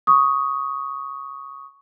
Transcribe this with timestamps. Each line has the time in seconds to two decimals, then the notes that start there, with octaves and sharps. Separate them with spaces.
0.07 C#6 D#6